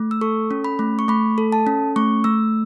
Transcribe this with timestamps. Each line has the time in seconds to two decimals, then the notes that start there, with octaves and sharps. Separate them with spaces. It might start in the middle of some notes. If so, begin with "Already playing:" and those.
Already playing: A3
0.11 E6
0.21 A4 C#6
0.51 C#4
0.64 B5
0.79 A3
0.99 C#6
1.08 A3 B5
1.38 A4
1.52 A5
1.67 C#4
1.96 A3 C#6
2.24 A3 E6